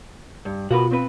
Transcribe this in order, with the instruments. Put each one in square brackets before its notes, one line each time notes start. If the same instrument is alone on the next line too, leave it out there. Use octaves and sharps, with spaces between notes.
[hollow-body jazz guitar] G2
[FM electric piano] B2 F4 [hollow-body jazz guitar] F#4 A#4 B4
[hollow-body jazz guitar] C4 B4